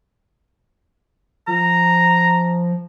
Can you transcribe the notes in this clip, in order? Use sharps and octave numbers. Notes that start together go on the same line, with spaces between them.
F3 A#5